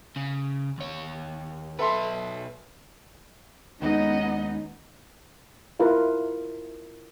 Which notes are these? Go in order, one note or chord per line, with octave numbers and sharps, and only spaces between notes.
C#3
D#2 C#5
B1 A4 B4 E5 C6
D#2 G#3 B3 C#4 D#4 D#5 F#5
E4 F4 A#4 B4 F5